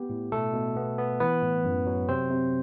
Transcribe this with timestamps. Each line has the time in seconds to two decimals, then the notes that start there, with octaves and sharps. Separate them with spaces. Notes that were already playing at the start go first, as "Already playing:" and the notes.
Already playing: B3 G4
0.10 A2
0.32 B2 A3 A4
0.54 B2
0.76 B3
0.98 B3
1.20 E3 B3 B4
1.42 A2
1.65 F#2
1.86 F#3
2.08 C3 C4 C5
2.31 C3